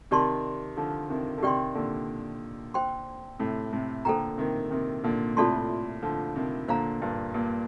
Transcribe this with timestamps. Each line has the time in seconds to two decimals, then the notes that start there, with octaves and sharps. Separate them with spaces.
0.11 C3 D#3 G4 D5 A5 C6
0.77 D3 F3
1.09 C3 D#3
1.38 D3
1.43 C3 D#3 G4 D5 G5 C6
1.75 A#2 D3
2.74 C5 G5 C6
3.39 A2 C3
3.73 A2 C3
4.05 A#2 D3 A4 C5 G5 A#5
4.38 C3 D#3
4.70 C3 D#3
5.04 A#2 D3
5.37 A2 C3 F4 A4 D5 A5 C6
6.02 D3 F3
6.36 C3 D#3
6.68 A#2 D3 C5 F5 A#5
7.01 G2 A#2
7.34 G2 A#2